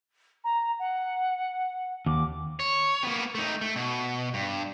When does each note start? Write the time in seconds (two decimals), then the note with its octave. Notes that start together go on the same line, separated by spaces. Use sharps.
0.44 A#5
0.79 F#5
2.06 D#2 D6
2.60 C#5
3.04 A#3 B3
3.35 A3 D#4
3.62 A3
3.76 B2
4.34 G2